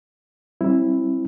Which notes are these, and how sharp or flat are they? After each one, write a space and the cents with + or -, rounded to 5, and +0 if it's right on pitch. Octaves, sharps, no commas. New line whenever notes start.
G3 -45 C4 +25 E4 +0